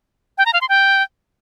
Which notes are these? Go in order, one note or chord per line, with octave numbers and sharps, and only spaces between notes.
G5
A#5
F5
C6
G5